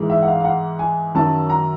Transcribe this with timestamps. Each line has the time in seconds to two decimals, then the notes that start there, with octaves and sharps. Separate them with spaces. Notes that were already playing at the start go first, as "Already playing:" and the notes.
Already playing: G#2 E3 G#3
0.10 E5
0.22 F#5
0.28 F5
0.40 F5
0.45 F#5
0.79 G#5
1.15 F#2 D#3 F#3 A5
1.50 A#5